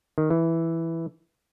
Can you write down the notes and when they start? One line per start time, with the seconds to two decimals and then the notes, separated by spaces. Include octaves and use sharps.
0.18 D#3
0.30 E3